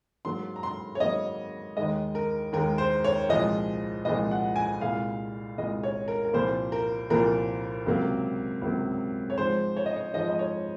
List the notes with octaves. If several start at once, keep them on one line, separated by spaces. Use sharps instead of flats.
G#2 F#3 A#3 C6
A#5
C6
C#5
G#2 F#3 A#3 D#5
D#2 D#3 G#3 D#5
A#4
D#2 D#3 G#3 A#4
C5
C#5
C2 A#2 F3 G#3 D#5
C2 A#2 F3 G#3 D#5
F#5
G#5
C2 A#2 G#3 F5
C2 A#2 G#3 D#5
C#5
A#4
A#4
C2 A#2 F3 A#3 C5
A#4
C2 A#2 F3 A#3 A#4
C#2 C3 F#3 A#3
C#2 C3 F#3 A#3
C#5
G#2 F3 G#3 C5
C#5
D#5
C#5
G#2 F3 G#3 D#5
D#5
C#5